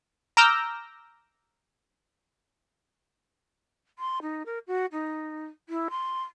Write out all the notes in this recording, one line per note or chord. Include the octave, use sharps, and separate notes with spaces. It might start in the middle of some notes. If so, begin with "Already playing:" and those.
A#5 D6 E6 F6 G6 A#6
C6
D#4
A#4
F#4
D#4
E4
C6